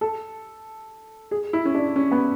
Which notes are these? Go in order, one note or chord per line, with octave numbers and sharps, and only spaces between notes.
A4
G#4
E4
C#4
D4
C#4
B3